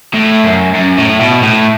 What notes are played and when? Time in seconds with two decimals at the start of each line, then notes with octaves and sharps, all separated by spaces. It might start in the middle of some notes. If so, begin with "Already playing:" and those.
0.14 A2
0.44 F#2
0.75 F#2
0.98 A2
1.20 B2
1.42 A2